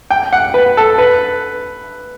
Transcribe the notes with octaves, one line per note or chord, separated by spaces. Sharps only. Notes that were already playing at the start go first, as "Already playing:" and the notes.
G5
F#5
B4
A4
B4